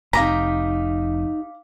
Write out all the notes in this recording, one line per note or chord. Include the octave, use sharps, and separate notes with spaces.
F1 D#4 G4 F5 G#5 A#5 D6 B6